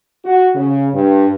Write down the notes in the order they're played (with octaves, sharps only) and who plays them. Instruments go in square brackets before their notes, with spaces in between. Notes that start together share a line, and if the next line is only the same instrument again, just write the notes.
[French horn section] F#4
C#3
G2